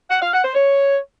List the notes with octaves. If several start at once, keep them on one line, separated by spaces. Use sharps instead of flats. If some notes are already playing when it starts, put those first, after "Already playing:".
F#5
F5
F#5
C5
C#5